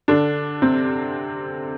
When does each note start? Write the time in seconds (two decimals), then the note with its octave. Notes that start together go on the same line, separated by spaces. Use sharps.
0.08 D3 D4
0.62 C3 C4